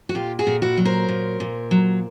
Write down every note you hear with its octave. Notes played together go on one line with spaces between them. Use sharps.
F#4
A#2 F4 G4
F#4 G#4
A#2
E4 F#4
F#3
A#4 C5
A#2
A#2
F#3